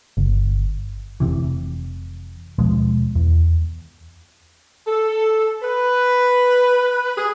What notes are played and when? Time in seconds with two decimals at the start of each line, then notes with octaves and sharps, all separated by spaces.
0.17 G1
1.20 F1 B1 C3 E3
2.59 D#2 B2 F3 G#3
3.15 E2
4.87 A4
5.63 B4
7.16 G#4